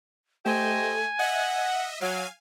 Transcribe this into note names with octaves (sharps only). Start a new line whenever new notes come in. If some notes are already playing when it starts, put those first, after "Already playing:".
A3 G4 C5 D#5 G#5
D#5 E5 F#5
F#3 F5 G#5